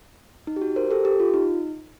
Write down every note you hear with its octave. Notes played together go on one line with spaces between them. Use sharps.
D#4
G4
F#4
A#4 C5
G4 A4
G4
F4
D#4